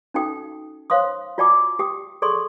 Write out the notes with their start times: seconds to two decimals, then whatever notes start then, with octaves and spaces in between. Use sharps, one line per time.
0.14 C#4 D#4 F#4 A4 G5 D#6
0.90 C5 C#5 F5 C6 D#6
1.38 F4 F#4 D5 G5 A5 D6
1.79 G4 G5 D#6
2.22 G#4 A4 D5 C6 C#6